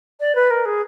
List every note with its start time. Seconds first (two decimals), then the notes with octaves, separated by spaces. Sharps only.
0.20 D5
0.35 B4
0.50 A#4
0.65 G#4